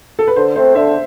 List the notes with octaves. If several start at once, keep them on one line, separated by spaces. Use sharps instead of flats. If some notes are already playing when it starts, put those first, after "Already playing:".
A4
B4
D3 C5
A3 C4 C5
D3 E5